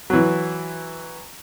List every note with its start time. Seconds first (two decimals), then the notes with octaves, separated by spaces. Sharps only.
0.10 E3 F#3